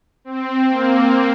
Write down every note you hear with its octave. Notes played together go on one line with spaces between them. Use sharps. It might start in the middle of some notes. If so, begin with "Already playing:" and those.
C4
A#3